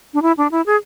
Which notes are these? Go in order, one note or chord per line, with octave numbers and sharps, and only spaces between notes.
D4
E4
D4
E4
G#4